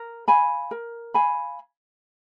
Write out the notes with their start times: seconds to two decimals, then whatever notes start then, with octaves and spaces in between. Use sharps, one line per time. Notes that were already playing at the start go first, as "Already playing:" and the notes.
Already playing: A#4
0.28 F5 G#5 B5
0.71 A#4
1.14 F5 G#5 B5